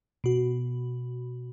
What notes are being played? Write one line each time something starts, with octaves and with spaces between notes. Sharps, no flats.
B2 F#4